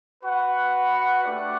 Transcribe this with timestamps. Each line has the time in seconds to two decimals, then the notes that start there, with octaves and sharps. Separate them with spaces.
0.23 F#4 B4 F#5
1.24 A3 D4 G4 D5 F#5